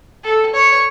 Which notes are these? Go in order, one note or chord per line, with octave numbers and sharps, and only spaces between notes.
A4
C#5